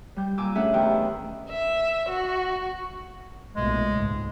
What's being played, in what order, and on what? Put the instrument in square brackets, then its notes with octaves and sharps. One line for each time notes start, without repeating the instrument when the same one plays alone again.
[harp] G3 G6
A#2 G#5 D6 E6
A3 C#4 D4 G#4 E5 F#5
E2 D#3 G4 F#5 G5 E6
[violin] E5
F#4
[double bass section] B1 A#2 A3 [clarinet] G#3
[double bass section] C#2 G#2